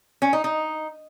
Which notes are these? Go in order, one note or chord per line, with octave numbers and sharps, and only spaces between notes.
C#4
D#4
D#4